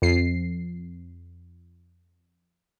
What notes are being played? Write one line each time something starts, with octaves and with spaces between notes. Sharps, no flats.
F2 C7